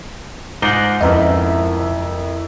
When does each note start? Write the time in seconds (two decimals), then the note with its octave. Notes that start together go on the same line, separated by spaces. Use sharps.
0.62 G#2 D#4 F4 D6 F#6 G7
1.01 F2 C#4 E4 A#4 B4 D#5 E5